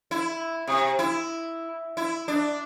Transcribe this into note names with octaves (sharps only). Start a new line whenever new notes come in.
E4
C3
E4
E4
D4